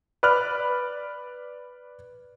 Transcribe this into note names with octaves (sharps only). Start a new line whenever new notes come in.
B4 D5 B5 F6 F#6